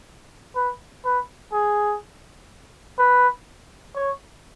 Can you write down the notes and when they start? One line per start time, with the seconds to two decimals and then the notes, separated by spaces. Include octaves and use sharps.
0.56 B4
1.05 B4
1.52 G#4
2.99 B4
3.95 C#5